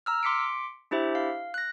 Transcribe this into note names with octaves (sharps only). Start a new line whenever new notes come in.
A#5 E6 F6
C6 D6 B6 C#7 D7
D4 E4 G4 C5 E5
F5
F#6 A#6